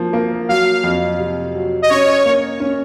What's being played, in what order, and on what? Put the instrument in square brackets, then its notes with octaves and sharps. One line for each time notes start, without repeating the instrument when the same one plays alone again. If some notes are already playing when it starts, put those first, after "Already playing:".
Already playing: [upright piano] F3 A#3
A#3
[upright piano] F#3 [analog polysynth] F5
[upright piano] F2
C3
F#3
[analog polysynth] D#5
[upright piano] C#4 [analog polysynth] C#5
[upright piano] A#3
C#4